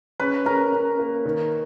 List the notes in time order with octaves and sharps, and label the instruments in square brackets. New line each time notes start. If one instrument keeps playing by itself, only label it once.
[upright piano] C#4 [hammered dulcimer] B4
[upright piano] C#4 [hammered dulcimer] A#4
[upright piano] C#4
A#3
D#3